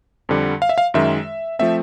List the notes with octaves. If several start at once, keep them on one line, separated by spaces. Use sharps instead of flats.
F2 D3 G3
F5
E5
F5
F#2 D#3 G#3 E5
F3 A3 C4 E5